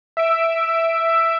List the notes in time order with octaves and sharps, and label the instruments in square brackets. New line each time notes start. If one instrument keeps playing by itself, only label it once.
[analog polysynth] E5 D7